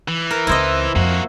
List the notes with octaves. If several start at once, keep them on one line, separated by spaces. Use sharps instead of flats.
E3
A#4
C#2 C4 E4 C5 D#5
F2 A#3 F#4